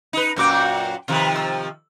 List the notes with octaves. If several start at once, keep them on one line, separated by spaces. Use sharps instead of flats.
D#4 B4
F#2 A#2 F#4 G5 D6 G6
C3 D#3 F3 F4 B4
E6